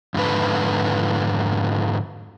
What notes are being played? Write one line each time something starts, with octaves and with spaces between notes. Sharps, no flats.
F2 G#2 D3 B4